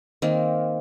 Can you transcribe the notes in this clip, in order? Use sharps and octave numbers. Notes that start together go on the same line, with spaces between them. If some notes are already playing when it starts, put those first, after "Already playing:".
D#3 A#3 C4